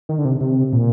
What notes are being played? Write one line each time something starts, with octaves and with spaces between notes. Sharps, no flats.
D#3
D3
C3
C3
A#2